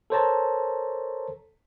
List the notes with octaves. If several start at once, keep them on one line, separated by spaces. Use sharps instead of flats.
A4 A#4 C5 C#5 A5 A#5